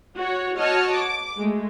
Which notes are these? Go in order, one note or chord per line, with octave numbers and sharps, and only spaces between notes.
F#4 C#5
F#4 C#5 D#5 A5 F6
D6
G#3 A3